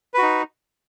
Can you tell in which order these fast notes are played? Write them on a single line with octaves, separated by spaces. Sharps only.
B4 F#4 D#4